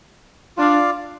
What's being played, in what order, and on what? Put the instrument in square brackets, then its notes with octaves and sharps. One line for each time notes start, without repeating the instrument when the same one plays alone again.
[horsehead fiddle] D4 [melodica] F4 D5 F5